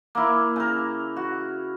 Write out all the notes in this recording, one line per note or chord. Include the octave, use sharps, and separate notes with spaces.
A#3 E4
C#3 A#4
F#4